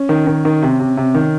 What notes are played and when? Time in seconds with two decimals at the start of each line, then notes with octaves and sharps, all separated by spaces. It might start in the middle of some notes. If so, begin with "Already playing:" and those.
Already playing: C#4
0.09 D#3
0.27 D#3
0.45 D#3
0.62 C3
0.80 C3
0.97 C3
1.15 D#3